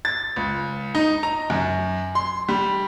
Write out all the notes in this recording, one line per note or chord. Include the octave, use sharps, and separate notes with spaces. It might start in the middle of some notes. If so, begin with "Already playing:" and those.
A6
C#2
D#4
A#5
F#2
C6
G3